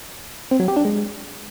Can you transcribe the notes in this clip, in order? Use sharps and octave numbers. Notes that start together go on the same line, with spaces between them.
C4
F#3
G4
D4
G#3